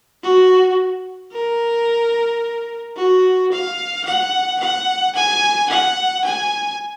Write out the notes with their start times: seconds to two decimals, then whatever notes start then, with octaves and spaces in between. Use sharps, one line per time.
0.23 F#4
1.32 A#4
2.96 F#4
3.52 F5
4.05 F#5
4.60 F#5
5.15 G#5
5.70 F#5
6.24 G#5